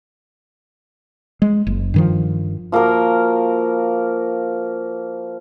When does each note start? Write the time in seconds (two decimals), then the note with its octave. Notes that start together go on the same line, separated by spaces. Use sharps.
1.42 G#3
1.67 F#1
1.94 G2 D#3 F3
2.72 F3 A#3 F#4 A#4